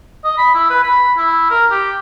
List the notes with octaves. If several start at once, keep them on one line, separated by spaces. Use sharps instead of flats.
D#5
B5
E4
B4
B5
E4
A#4
G4